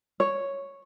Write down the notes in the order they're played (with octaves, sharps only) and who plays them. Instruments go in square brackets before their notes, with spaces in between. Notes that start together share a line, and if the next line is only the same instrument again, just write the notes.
[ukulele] C#5